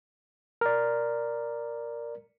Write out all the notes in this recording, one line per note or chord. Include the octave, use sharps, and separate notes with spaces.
A#4 D5